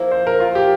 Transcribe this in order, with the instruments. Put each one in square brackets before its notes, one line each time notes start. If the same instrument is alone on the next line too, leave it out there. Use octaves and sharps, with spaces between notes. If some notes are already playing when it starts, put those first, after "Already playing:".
Already playing: [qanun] F3 A#3 E4
[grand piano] C5
A#4
F4
G4